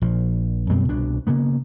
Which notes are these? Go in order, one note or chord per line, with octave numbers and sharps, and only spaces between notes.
A#1 F3
F#2 B2 G3 C4
C2 B2 D4
C#3 A#3 B3